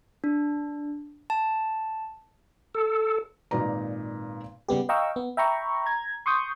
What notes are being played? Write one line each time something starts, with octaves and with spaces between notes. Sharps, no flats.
D4
A5
A4
G#1 A#2 D#4 B4 D5 A#5
C#3 G3 B3 G4
D#5 F5 G5 A#5 C#6 E6
B3
E5 G5 A#5 B5 C#6
A#5 G#6
C6 C#6 D#6 G6